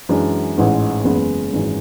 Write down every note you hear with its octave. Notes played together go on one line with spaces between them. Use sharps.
F#2 E3 G#3 D4
A1 G#2 E3 G#3 C#4
F#1 E2 C#3 G#3 B3
G#1 F#2 E3 G#3 C#4